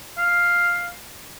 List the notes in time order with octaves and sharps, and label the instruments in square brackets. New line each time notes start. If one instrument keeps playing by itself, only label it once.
[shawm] F5